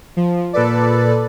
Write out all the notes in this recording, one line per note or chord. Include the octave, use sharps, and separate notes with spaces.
F3
A#2 A4 B4 D5